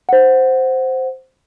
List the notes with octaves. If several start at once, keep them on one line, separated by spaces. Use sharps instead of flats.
C5 F#5